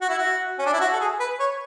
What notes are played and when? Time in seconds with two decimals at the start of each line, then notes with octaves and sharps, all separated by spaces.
0.01 F#4
0.09 E4
0.18 F#4
0.59 C#4
0.65 D4
0.73 E4
0.81 F#4
0.93 A4
1.00 G#4
1.20 B4
1.39 C#5